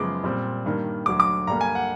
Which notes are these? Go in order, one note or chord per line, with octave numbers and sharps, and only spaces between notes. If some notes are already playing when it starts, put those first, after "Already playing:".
Already playing: F#2 C#3 F3 G#3 B3 D6
A#2 G3 C4
G2 D#3 G3 A#3
D2 D3 F#3 D6
D6
G2 D3 G3 A#3 A#5
G#5
F#5